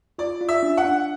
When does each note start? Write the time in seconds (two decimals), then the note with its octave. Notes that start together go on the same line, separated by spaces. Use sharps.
0.18 F4 D5
0.41 F4
0.49 E5
0.63 D4
0.77 F#5
0.85 D4